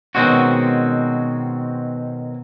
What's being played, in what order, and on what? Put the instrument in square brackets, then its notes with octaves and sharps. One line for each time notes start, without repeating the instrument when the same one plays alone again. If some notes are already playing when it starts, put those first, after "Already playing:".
[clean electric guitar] B2 D#3 G#3 C4 C#4 F#4